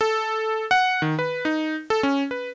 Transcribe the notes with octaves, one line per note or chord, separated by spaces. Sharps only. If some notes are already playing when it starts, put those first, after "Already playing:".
A4
F#5
D#3
B4
D#4
A4
C#4
B4